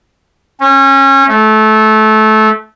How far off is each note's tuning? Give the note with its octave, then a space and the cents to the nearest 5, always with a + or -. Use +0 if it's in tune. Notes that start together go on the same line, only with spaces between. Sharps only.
C#4 -30
A3 -20